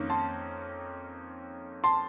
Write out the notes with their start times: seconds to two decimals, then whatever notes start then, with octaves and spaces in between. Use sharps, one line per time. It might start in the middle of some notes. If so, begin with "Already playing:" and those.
Already playing: F2 D#3 A#3 C#4
0.10 A5 C6
1.84 A5 C6